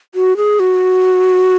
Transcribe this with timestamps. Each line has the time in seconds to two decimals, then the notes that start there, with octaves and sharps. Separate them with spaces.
0.15 F#4
0.37 G#4
0.60 F#4